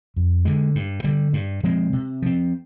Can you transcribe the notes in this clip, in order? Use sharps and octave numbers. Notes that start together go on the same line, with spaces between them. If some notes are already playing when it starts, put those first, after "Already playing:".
F2
D3 G#3
G2
D3 G3
G2
F3 G#3 C4
C3
F3 C4